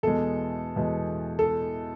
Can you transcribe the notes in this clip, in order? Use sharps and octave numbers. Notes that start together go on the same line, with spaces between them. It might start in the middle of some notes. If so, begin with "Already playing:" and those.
E2 B2 G#3 A4
E2 B2 G#3
A4